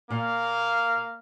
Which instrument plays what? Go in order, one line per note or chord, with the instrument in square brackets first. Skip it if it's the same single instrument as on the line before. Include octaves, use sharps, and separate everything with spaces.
[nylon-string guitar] A#2 [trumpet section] A#3 F5